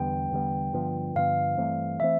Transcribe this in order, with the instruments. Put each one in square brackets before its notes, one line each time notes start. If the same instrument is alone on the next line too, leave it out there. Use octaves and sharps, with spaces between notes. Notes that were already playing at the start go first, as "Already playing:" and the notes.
Already playing: [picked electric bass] E2 D3 G3 B3 [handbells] G5
[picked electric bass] E2 D3 G3 B3
G2 D3 F3 B3
[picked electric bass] G2 D3 F3 B3 [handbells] F5
[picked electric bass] G2 E3 A3 C4
[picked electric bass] E3 A3 C4 [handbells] E5